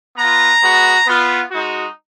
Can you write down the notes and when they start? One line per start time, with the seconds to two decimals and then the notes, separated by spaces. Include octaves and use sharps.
0.16 B3 F4 A#5
0.61 G#3 B3 F#4
1.06 B3 F4
1.50 G#3 D#4 F#4